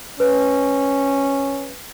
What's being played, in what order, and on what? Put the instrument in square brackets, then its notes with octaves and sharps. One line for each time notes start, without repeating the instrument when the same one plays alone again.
[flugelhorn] C#4 [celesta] B4